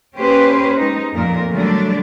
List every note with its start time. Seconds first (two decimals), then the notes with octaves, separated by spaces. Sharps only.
0.15 A#3 C#4 G4 B4 C5
0.76 G#3 D#4
1.13 F2 A#2 A#4
1.51 D3 F#3 G3 A3 D4